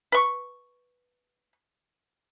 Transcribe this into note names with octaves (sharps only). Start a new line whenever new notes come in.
B4 C#6